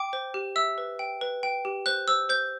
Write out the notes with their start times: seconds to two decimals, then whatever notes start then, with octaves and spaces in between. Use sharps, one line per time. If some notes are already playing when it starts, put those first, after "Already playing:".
Already playing: G5 D6
0.13 C5
0.34 G4
0.56 E5 E6
0.78 B4
0.99 G5
1.21 B4
1.43 G5
1.65 G4
1.86 C5 F#6
2.08 C5 E6
2.29 C5 G6